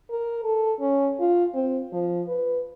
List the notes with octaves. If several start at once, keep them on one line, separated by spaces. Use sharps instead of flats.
A#4
A4
C#4
F4
C4
F3
B4